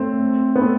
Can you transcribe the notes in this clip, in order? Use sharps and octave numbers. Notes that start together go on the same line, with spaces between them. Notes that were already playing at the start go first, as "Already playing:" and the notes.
Already playing: A3 C4
B3
A3 C4